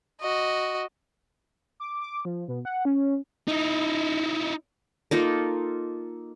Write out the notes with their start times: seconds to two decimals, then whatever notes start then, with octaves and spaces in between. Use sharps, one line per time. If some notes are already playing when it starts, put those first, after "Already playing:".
0.21 F#4 D#5
1.80 D6
2.01 D6
2.25 F3
2.48 B2
2.65 F#5
2.85 C#4
3.48 D#4 E4
5.11 A#3 D#4 F4 A4